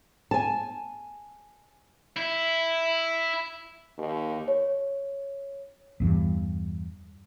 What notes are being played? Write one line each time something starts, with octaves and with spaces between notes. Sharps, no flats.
G#5 A5
E4
D#2
C#5
E2 G2 E3